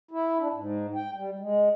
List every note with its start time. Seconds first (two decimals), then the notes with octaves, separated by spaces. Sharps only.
0.11 E4
0.38 D4
0.54 G#2
0.95 G5
1.14 G3
1.39 G#3